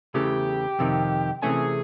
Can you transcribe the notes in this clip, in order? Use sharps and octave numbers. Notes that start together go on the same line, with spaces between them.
E2 C#3 E3 A3 G4
F2 C3 D#3
C3 E3 A3 C#4 G#4